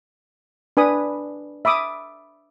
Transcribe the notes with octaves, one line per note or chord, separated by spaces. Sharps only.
D4 B4 G#5 B5 D#6
E5 B5 D6 D#6